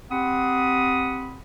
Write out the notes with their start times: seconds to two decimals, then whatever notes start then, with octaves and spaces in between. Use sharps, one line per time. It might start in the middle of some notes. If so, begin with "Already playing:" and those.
0.11 C4 G4 F#5 B5 D#6